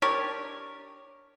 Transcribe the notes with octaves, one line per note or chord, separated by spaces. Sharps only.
D4 G4 A#4 C#5